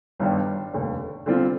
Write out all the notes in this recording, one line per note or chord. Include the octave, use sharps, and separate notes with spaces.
G1 G2 D#3 G3
F1 D#2 D3
D3 G3 C4 F4